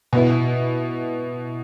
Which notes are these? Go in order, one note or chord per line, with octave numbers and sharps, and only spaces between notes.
B2 B3 E4